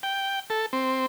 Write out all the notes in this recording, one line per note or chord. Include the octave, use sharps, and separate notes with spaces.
G5
A4
C4